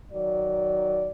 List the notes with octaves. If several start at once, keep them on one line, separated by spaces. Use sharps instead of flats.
D#3 F#3 D5